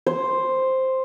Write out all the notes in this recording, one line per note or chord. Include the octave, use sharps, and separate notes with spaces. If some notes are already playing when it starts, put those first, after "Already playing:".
C5